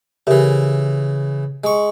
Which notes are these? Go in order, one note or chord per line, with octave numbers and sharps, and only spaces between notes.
C#3 E3 G4 A#4 E5
G#3 C#6